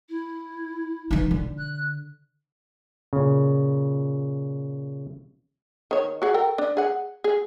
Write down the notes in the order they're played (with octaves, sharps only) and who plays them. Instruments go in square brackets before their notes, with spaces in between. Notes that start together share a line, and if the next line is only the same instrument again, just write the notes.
[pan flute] E4
[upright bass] E3 D#4
D3
[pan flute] F#6
[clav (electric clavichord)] A#2 C#3
[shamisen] D#3 C#5
F#4 G#4 F#5
A4 A#4 G5
D4
G#4 F#5
G#4